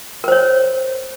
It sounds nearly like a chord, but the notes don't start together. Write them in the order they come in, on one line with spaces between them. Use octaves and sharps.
A#4 C5 C#5